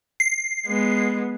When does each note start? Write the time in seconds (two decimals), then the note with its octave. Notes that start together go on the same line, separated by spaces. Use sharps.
0.20 C7
0.67 G#3 B3